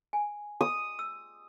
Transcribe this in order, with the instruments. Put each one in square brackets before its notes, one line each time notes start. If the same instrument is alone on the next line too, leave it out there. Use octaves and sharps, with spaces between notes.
[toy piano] G#5
[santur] D#6
[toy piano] E6